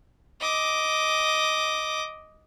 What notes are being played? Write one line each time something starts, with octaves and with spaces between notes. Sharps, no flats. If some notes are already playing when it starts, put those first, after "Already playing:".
D#5 D6